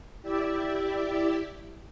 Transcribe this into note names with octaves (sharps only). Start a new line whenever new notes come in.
E4 G4 D5 E5